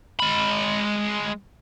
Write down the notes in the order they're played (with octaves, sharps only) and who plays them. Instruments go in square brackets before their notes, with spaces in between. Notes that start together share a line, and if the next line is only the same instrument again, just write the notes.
[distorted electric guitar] G#3 B5